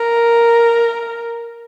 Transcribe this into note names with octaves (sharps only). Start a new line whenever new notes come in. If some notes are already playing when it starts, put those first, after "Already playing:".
Already playing: A#4